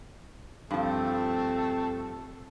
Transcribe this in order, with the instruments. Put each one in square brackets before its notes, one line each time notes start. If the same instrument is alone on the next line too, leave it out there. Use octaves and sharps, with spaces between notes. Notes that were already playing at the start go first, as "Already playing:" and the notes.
[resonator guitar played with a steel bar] G2 F3 [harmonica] A3 A4 A5 [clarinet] C4